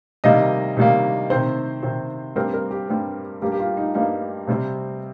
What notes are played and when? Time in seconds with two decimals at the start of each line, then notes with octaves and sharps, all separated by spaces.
0.24 C3 D#3 G3 A#3 D#5
0.77 C3 D#3 G3 A#3
1.30 C3 D#3 C4 C5
1.83 C3 D#3 C4
2.36 G2 G3 C4 A#4
2.54 A#4
2.71 G4
2.89 G2 G3 C4
3.42 G2 G3 A#3 G4
3.52 G4
3.60 F4
3.77 D#4
3.95 G2 G3 A#3 D#4
4.48 C3 G3 C4